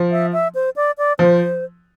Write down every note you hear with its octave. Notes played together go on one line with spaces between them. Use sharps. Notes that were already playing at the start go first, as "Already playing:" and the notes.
Already playing: F3
E5
E5
C5
D5
D5
F3 C5